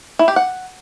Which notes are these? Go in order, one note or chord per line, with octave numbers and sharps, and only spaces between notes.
E4
G4
F#5